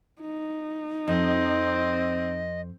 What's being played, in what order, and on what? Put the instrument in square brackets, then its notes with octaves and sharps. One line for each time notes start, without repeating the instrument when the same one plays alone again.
[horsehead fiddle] D#4
[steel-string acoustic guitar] F2 [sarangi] C4 [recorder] D#5